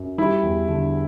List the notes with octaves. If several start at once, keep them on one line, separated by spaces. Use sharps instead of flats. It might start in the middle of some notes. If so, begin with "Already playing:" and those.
Already playing: F#2
G3 E4
E2
D3